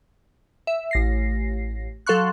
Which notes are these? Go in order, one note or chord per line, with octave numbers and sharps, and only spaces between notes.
E5
A1 A#6 C7
F#3 A4 F5 C6 C#6 F#6